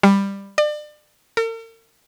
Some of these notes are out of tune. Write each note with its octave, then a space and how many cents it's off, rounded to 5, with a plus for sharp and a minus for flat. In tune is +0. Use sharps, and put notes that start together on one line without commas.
G3 +15
D5 +35
A#4 -45